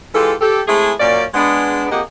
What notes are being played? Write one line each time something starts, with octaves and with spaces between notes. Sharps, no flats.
E3 G#3 F4 G4 A4
G4 A4
G#3 A3 C4 E4 G#4
F#2 A#2 A#3 C#4 D5
G#3 B3 D4
F2 A#3 G4 G#4 D#5 F#5